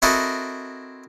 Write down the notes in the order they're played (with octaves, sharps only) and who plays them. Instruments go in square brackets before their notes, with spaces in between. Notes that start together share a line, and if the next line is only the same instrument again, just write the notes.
[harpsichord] C4 E4 F#4 A4 A#4 D#5